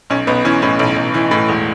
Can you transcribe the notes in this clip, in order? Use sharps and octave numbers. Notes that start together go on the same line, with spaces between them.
B1 C#4
B1 B3
E3 C#4
A2 C#4
B1
B1
E3
A2
E1